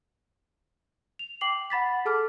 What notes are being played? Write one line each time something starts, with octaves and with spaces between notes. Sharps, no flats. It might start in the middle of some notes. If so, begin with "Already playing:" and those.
F7
G5 D6 C7 F#7
F#5 B5 A6 B6
G#4 A4 A5 D6 F6